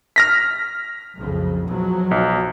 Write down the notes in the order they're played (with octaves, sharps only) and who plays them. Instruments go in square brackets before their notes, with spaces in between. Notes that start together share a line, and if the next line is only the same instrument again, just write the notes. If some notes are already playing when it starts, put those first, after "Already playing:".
[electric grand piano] F6 A#6 B6
[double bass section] B1 F2 C#3
B2 F3 F#3
[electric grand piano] B1